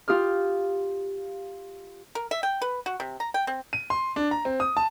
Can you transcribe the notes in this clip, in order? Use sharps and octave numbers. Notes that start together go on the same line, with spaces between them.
F4 G4 D#6 F6
A#4
E5
G5
B4
F#4
C3
A#5
G5
C4
D#7
C6
D4
A#5
C4
D#6
A5